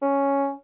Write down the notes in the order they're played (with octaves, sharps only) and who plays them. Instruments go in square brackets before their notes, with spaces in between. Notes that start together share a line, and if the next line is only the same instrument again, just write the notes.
[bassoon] C#4